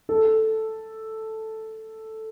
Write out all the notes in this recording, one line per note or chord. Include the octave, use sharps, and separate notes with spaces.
A4